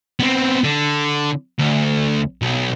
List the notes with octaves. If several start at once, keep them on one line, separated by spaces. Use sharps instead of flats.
B3 C4
D3
D2
B1